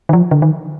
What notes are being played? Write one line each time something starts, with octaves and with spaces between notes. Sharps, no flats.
D#3
F3
D3
D#3